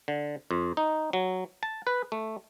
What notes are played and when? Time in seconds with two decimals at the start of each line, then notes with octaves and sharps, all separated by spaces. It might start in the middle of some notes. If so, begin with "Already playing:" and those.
0.08 D3
0.51 F2
0.77 D#4
1.13 F#3
1.63 A5
1.87 B4
2.12 A3